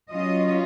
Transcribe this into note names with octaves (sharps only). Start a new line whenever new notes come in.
F#3 C#4 F4 D#5